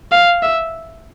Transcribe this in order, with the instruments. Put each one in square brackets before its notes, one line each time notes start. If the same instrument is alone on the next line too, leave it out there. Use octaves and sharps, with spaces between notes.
[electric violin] F5
E5